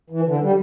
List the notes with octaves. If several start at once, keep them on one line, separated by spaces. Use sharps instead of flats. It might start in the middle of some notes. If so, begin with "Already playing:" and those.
E3
D3
G3